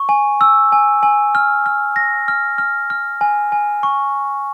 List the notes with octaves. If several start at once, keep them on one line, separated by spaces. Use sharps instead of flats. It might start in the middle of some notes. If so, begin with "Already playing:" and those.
Already playing: C#6
G#5
E6
G#5
G#5
F6
F6
A#6
F6
F6
F6
G#5
G#5
C#6